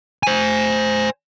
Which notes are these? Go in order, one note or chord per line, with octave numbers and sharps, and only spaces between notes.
C5 G#5